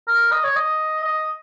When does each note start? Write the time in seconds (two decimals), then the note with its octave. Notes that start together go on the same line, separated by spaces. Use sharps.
0.08 A#4
0.32 D#5
0.44 C#5
0.56 D#5
1.04 D#5